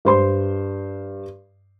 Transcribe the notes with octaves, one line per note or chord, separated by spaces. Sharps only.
G2 C5 C6